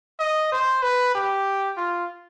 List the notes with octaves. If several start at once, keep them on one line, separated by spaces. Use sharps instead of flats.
D#5
C5
B4
G4
F4